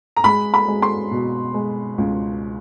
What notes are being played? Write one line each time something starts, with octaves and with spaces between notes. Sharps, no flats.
A#5
G#3 B5
B5
G#3
C6
B2
G#3
C#2